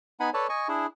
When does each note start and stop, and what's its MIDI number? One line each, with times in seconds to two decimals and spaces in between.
0.20 0.30 59
0.20 0.30 63
0.20 0.30 78
0.20 0.30 80
0.20 0.30 83
0.34 0.47 69
0.34 0.47 71
0.34 0.47 73
0.34 0.47 74
0.34 0.47 81
0.49 0.68 75
0.49 0.68 80
0.49 0.68 85
0.68 0.86 62
0.68 0.86 64
0.68 0.86 68